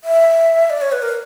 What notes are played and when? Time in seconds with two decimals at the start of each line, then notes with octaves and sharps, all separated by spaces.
0.04 E5
0.70 D5
0.81 C#5
0.92 B4
1.02 A#4